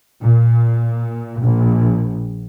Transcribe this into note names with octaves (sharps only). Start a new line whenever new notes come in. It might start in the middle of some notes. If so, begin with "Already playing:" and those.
A#2
A#1